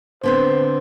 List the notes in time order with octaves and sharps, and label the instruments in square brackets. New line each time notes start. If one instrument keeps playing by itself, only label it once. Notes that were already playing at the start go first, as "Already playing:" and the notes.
[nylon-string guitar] D3 B3 C4 [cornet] C5